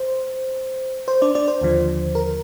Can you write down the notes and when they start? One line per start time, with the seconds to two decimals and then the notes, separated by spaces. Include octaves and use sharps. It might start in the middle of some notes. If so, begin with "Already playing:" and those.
Already playing: C5
1.08 C5
1.22 D4 D5
1.35 D4 D5
1.48 C5
1.61 D#2 D3 F3
2.15 A#4